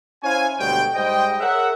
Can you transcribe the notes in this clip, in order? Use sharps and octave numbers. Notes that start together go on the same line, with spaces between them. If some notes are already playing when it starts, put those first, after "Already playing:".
C#4 E4 C5 C#5 F5 G#5
D2 B2 G3 G#3 C#5 G5
G#2 G3 C5 D#5 G5
G#4 A#4 C#5 E5 F#5